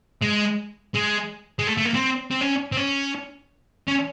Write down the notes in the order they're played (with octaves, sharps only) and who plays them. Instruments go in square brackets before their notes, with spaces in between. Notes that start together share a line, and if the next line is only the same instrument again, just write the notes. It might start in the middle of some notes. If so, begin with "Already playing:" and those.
[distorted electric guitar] G#3
G#3
G#3
A3
A3
A#3
C4
C4
C#4
C4
C#4
C#4